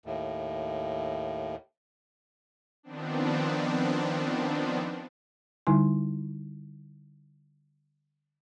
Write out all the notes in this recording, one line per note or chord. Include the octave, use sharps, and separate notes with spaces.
D#2 A2
D#3 F3 B3 C4 D4
D3 G3 D#4 E4 G#5 C6